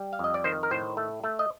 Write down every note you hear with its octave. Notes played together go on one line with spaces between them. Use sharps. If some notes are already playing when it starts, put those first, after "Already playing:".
Already playing: G3
F5
F2 D#5
D5
D#3 C5
A#4
A2 C5
A3
A3
D#5